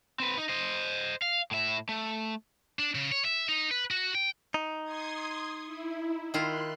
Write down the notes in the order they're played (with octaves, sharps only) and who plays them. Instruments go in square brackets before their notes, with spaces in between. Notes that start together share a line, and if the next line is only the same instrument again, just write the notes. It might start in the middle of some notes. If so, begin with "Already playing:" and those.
[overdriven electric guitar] C4 B4
D#4
C5 D#5
F5
A2 E5
A3
[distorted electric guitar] D4
C#3
C#5
E5
D#4
B4
F#4
G5
[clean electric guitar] D#4
[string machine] C6 D#6 G#6
E4
[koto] D#3 E4 F4 [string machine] C6 F#6